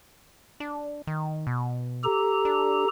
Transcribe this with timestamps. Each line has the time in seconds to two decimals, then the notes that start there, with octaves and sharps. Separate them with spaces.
0.60 D4
1.07 D#3
1.47 B2
2.04 G4 A4 A#5
2.45 D4